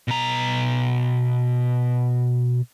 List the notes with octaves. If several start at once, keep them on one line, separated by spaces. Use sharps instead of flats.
B2 A#5